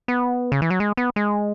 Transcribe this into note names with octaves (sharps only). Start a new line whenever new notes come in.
B3
C#3
E3
F#3
G#3
B3
G#3